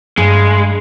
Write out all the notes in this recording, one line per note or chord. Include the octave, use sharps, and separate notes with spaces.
G2 G#3